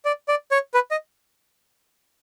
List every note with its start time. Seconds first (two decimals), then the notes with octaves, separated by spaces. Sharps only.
0.05 D5
0.28 D5
0.51 C#5
0.74 B4
0.91 D#5